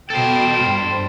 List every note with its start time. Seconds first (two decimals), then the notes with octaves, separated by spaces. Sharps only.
0.10 B2 A4 C5 G5
0.64 G2